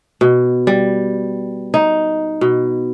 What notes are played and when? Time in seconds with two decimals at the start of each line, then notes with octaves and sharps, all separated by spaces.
0.21 B2
0.67 G3
1.74 D#4
2.41 B2